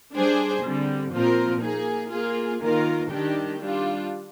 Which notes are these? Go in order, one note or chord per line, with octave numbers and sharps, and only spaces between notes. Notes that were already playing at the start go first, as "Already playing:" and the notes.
G3 D4 G#4 C5
D3 G3 C4
A#2 F3 C4 F4 A#4
A#3 D#4 G#4
A#3 F4 G#4
D#3 A#3 F4 A#4
D#3 G3 D4 G4
G3 D4 F4